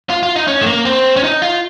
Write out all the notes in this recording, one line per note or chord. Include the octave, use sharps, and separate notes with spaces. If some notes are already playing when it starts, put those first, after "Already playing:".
F4
F4
D#4
C#4
A3
A#3
C4
C#4
D#4
F4